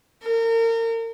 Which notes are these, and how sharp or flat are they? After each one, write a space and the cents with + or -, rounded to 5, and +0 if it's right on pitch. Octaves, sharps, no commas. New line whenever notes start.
A#4 -35